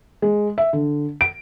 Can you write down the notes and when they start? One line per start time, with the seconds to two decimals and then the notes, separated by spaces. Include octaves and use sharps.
0.22 G#3
0.58 E5
0.73 D3
1.21 D7